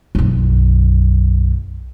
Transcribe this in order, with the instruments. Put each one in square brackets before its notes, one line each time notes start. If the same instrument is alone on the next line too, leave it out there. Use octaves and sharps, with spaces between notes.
[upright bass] B1 F#2